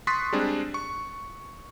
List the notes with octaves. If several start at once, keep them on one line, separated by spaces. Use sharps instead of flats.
C6 C#6 D#6 F#6 A6 B6
G3 G#3 C4 D4 G#4
C#6